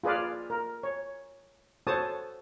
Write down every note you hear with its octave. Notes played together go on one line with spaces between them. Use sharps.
F4 G#4 B4 D5 F5
A#4
C#5
F#4 A4 C5 C#5 A5 D#6